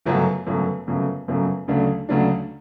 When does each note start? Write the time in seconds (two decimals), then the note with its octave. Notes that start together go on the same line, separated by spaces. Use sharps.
0.06 G1 F#2 C#3 F#3 A3
0.46 G1 F#2 C#3 F#3 A3
0.87 G1 F#2 C#3 F#3 A3
1.28 G1 F#2 C#3 F#3 A3
1.68 D2 C#3 F#3 A3 D4
2.09 D2 C#3 F#3 A3 D4